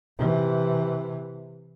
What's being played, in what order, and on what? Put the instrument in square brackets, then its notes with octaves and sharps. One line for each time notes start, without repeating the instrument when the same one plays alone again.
[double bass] C3 E3